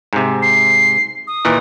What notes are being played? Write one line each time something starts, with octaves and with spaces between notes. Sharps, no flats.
G#2 C3
C7
D#6
A#2 D#3 E3